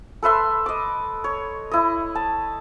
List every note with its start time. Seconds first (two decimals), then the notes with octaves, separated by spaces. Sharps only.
0.23 A4 B4 E5 C6
0.66 D#5 D6
1.24 C#5
1.72 E4 D#5
2.15 A5